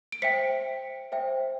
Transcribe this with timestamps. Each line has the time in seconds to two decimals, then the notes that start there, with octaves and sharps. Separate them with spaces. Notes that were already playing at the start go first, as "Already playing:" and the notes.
0.12 D7
0.22 C5 E5 G5 B6 C#7
1.12 C5 E5 G5